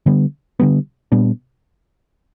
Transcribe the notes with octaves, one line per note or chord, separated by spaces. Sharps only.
D3 G3 B3
D3 G3 B3
A#2 G3 B3 D4